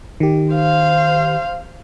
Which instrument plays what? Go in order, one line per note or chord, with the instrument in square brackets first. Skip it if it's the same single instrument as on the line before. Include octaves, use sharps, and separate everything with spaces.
[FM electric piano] D#3 G4
[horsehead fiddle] C5 F5